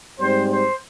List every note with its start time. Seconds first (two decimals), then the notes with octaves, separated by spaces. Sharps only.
0.20 G#2 G3 C4 C5
0.51 C5